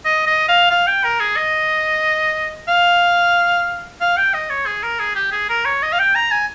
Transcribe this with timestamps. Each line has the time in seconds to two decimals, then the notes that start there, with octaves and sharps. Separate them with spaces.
0.05 D#5
0.27 D#5
0.49 F5
0.70 F5
0.87 G5
1.04 A#4
1.20 G#4
1.37 D#5
2.68 F5
4.01 F5
4.17 G5
4.34 D#5
4.50 C#5
4.66 G#4
4.83 A#4
4.99 G#4
5.16 G4
5.32 G#4
5.50 A#4
5.65 C#5
5.83 D#5
5.93 F5
5.99 G5
6.15 A#5
6.32 G#5